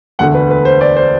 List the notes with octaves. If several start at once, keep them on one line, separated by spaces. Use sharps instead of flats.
E1 D2 D3 A3 F#5
B4
B4
C5
D5
C5